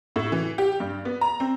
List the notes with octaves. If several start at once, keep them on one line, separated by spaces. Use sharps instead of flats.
A2
E3
G4
G2
B3
A#5
C4